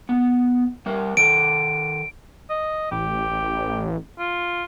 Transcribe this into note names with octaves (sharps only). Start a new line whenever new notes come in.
B3
G3 A#4
D#3 A4 D7
D#5
A1 G4
F4